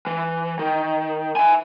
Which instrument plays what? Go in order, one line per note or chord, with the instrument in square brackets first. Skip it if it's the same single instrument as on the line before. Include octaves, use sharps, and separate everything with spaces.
[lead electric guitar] E3
D#3
E5 G#5